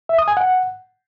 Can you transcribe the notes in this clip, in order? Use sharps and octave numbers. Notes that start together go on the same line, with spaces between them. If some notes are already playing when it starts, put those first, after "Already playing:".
E5
D#6
G#5
F#5